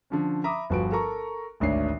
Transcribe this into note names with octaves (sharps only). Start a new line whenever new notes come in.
D3 F3 C#4
E5 A#5 B5 D6 D#6
G1 F3 F#4 B4 D7
A4 A#4 A#5 C#6
G#1 D2 D4 C#5 C7